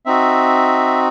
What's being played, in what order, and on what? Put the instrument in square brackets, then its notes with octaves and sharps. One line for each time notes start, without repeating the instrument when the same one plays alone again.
[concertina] C4 D#4 F#4 E5